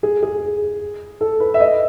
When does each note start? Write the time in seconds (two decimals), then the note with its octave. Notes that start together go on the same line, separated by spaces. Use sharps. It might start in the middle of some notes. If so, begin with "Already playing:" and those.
0.03 G#4
0.23 G#4
1.21 A4
1.40 B4
1.54 E5
1.60 D#5